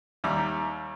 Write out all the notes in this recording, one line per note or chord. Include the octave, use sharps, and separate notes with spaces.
D#2 G3 E5 A#5 D6